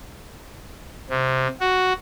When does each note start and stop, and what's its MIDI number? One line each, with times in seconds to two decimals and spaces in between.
1.10 1.48 48
1.60 1.93 66